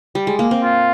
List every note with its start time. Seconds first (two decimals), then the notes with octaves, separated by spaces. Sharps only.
0.15 G3
0.27 G#3
0.39 A#3
0.51 C4
0.63 F4